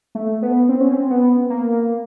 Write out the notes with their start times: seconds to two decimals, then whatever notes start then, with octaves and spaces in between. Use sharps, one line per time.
0.15 A3
0.42 B3
0.69 C4
0.81 C#4
0.93 C4
1.10 B3
1.50 A#3